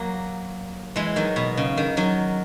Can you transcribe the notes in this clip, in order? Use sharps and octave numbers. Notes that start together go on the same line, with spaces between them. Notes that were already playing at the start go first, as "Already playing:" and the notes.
Already playing: F#3 A#3
E3 G#3
D#3 F#3
B2
C#3
D#3
D#3 F#3